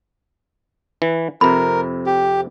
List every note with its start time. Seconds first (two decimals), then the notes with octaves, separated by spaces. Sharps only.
1.02 E3
1.41 F2 C3 A#4 B5
2.06 G4